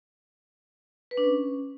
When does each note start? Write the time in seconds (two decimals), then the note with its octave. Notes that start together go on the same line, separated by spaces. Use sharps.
1.11 B4
1.17 D4
1.24 C#4